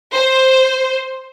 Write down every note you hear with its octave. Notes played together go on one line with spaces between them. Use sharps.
C5